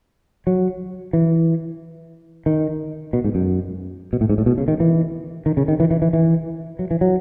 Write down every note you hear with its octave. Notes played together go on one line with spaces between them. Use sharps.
F#3
E3
D#3
B2
G#2
F#2
B2
A2
G#2
A2
B2
C#3
D#3
E3
D#3
C#3
D#3
E3
E3
E3
E3
F#3
E3
F#3